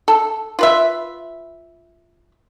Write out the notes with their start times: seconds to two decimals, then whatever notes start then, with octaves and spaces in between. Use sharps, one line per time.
0.08 A4
0.59 F4 B4 E5